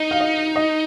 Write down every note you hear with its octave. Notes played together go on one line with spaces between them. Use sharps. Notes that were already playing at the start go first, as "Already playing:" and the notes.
Already playing: D#4 D#5
F5
D#5
D#5